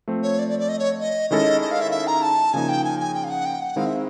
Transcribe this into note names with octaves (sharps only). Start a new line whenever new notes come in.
F3 A3 C4
C#5
D5
D5
D5
D#5
C#5
D#5
D#3 G#3 C#4 E4 A4 D#5
D#5
F5
E5
E5
A#5
A5
C#3 F3 A#3 D#4 G#5
G5
G#5
G#5
G5
F5
F#5
G5
F#5
D#3 G#3 C4 E4 F5
E5